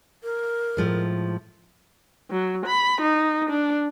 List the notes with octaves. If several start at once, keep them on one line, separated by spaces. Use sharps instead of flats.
A#4
A2 F3 G#3
F#3
B5
D#4
D4